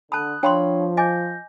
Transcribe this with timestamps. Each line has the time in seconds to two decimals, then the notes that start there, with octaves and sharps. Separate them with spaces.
0.12 D3 A5 B5 D#6 F#6
0.43 F3 D4 C#5 F5 G5 B5 C6
0.97 D#5 G#5 D6 G6 A#6